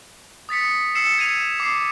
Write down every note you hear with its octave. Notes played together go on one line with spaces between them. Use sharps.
D#6 A6 B6 C#7
E6 C7 C#7 E7
G#6 C#7 D#7 F7
D6 C7